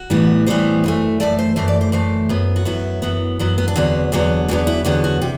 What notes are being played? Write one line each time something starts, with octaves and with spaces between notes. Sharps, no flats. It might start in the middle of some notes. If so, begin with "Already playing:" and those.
Already playing: F#4
A2 E3 G3 B3
A2 E3 G3 B3 C5
F#2 E3 A3
F#2 E3 A3 D5
C5
F#2 E3 A3 C5
D5
C5
F#2 E3 A3 C5
F#2 F#3 B3
F#4
F#2 F#3 B3 E4
F#2 F#3 B3
F#2 F#3 B3
B3
D4
E2 D3 F#3 B3 C4
E2 D3 F#3 B3 C4
E2 D3 F#3 B3 D4
E4
E2 D3 F#3 B3 G4
F#4
C3 G4